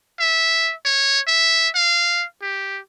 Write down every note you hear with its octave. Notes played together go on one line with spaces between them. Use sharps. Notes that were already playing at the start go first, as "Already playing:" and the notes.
E5
C#5
E5
F5
G4